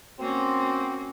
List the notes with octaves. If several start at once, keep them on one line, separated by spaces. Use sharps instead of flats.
A#3 C4 C#4 F#4